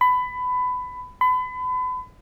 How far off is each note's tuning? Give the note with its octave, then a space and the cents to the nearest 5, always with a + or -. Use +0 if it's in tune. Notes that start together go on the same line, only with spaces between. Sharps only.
B5 +20
B5 +35